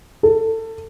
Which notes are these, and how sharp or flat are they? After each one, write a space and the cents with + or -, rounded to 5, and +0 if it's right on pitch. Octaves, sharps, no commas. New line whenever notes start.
A4 +25